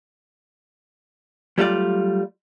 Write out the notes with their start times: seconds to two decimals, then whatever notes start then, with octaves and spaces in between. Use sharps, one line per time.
1.58 F#3 G3 A3 F4 D5